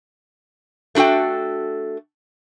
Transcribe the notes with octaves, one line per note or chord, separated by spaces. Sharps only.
A3 D4 F#4 A4 G5